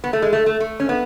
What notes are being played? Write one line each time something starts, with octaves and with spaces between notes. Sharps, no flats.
B3
A3
G#3
A3
A3
A3
C#4
B3